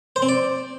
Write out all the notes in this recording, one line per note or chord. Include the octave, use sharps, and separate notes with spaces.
C5
C4
D5